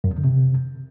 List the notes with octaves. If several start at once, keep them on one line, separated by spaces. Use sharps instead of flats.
F#2
E2
D3
C3